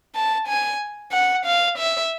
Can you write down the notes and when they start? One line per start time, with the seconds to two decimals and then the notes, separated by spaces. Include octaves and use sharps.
0.15 A5
0.48 G#5
1.12 F#5
1.46 F5
1.78 E5